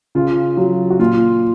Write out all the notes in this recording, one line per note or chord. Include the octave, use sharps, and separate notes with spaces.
C#3 F4
F#3
F#4
A#2 F4